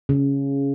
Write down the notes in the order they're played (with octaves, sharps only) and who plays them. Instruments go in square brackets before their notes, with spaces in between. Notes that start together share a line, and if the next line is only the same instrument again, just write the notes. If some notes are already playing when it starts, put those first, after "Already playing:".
[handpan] C#3